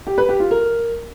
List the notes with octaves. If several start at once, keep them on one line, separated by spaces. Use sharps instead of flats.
G4
B4
G4
F4
A#4